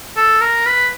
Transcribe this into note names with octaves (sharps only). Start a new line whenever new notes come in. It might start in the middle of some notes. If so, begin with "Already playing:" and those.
A4
A#4
B4